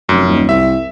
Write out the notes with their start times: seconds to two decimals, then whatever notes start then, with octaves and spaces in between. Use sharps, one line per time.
0.09 F1 F#2
0.28 D#1
0.49 C2 E5